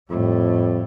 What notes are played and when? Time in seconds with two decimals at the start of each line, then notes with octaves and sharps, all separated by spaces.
0.11 F2 A2 G3